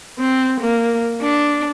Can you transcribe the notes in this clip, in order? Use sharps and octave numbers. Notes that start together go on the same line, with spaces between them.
C4
A#3
D4